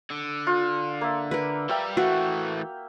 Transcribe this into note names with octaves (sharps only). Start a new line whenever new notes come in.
D3
F4
A#3 E5
A#4 B4
G3 G4 E5 F5 G5
E3 A3 F#4